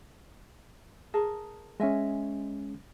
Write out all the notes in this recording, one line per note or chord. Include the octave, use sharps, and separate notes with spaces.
G#4 A#4 A5
G#3 C#4 D#5 E5 G#5